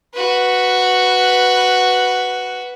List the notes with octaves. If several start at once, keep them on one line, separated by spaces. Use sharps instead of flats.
F#4 B4